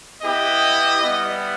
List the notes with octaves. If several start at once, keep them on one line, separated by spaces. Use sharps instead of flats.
B3 E4 G4 D#5
G3 B3 E4